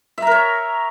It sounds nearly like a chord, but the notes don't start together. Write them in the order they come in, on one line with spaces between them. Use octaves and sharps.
E5 A#5 A#4 C#5